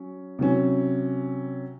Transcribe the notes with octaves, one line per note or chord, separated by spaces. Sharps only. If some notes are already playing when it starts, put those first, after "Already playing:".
Already playing: F#3 C#4
C3 F#3 C#4